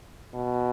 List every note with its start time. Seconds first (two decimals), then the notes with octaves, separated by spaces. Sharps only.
0.34 B2